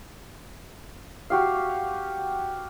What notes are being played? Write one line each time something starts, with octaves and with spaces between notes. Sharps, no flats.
F#4 G4 F5